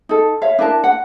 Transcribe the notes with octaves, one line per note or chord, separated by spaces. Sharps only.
D#4 A4
C#5 E5 F5
D4 E4 A#4 A5
F#5